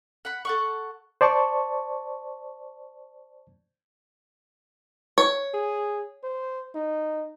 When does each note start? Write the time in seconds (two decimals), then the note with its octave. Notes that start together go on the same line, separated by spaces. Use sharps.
0.25 F#5 B5
0.45 A4 F#5 C#6
1.21 C5 D5 A5 C#6
5.18 C#5
5.54 G#4
6.24 C5
6.75 D#4